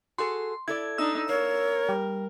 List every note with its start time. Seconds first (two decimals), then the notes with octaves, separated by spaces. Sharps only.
0.18 F#4 G#4 A4 C6
0.68 E4 A4 D5 G#6
0.98 D4 D#4 E6
1.29 A#3 A#4 C#5
1.89 G3